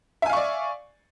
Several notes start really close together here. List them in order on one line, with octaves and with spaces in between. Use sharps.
E5 G#5 F5 C#6 D5